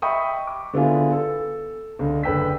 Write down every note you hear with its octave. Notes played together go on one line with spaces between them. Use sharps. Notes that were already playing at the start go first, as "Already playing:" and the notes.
D#5 E5 G5 B5 C#6 D#6
D6
D3 B3 E4 F4 G#4
A4
C#2 D3
F#1 D3 B4 G5 E6 B6